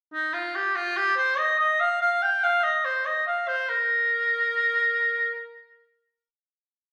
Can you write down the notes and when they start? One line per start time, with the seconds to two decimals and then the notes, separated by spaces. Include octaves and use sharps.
0.13 D#4
0.34 F4
0.55 G4
0.75 F4
0.97 G4
1.17 C5
1.38 D#5
1.59 D#5
1.80 F5
2.01 F5
2.22 G5
2.43 F5
2.63 D#5
2.85 C5
3.06 D#5
3.27 F5
3.48 C5
3.69 A#4